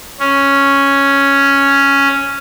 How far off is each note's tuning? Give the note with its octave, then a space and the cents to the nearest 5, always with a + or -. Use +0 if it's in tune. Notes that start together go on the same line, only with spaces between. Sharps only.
C#4 +0